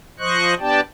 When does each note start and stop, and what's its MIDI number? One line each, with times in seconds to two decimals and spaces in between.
0.19 0.54 53
0.19 0.54 72
0.19 0.54 75
0.19 0.54 85
0.19 0.54 90
0.60 0.80 59
0.60 0.80 62
0.60 0.80 67
0.60 0.80 74
0.60 0.80 79
0.60 0.80 81